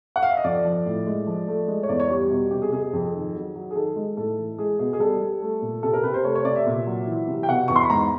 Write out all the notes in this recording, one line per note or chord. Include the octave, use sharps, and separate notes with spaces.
F#5
F5
E5
D#5
F2 D5
F3
A2
G#3
F3
A3
G#3
C#5
E2 D5
C#5
G3 G4
B2
C3 G4
G#4
C3 G#4
G#4
F2
D#3
F#3
F#3
G#4
D#3 A4
G#3
A2 A4
E3
G#3 G#4
B2 G#4
G#4
G3 A4
G3
A3
A#2
C3 A4
A#4
C3 B4
C5
A3 C#5
C#5
C3 D5
E5
A#2
F#3
E3
C3
G5
B2 F#5
E2 C#6
C6
B5
G#2 A#5